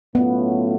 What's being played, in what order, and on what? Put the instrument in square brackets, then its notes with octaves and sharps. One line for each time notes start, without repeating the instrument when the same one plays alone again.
[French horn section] A2 F#3 A3 C#4 F4 [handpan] B3